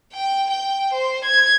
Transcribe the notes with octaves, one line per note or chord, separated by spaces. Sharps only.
G5
G5
C5
G#6